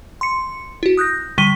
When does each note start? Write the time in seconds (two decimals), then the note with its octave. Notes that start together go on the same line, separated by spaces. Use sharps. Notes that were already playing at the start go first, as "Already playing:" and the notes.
0.21 C6 C#7
0.83 E4 F#4
0.97 D#6 F#6 G6 A#6
1.38 D3 G3 C#6 B6 D#7 G7